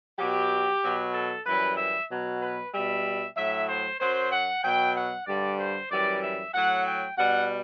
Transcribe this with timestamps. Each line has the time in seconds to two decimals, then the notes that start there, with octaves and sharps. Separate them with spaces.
0.19 B2 F#3 G4
0.83 B2 F#3
1.14 A4
1.46 F#2 E3 G3 B4
1.77 E5
2.10 B2 F#3
2.41 B4
2.73 B2 G3 E5
3.36 A2 F#3 E5
3.68 C5
4.00 F#2 F#3 C5
4.32 F#5
4.63 B2 F#3 G5
4.95 F#5
5.27 G2 D3 G3 D5
5.59 C5
5.91 F#2 E3 G3 D5
6.23 E5
6.54 A2 F#3 F#5
6.86 G5
7.18 B2 G3 F#5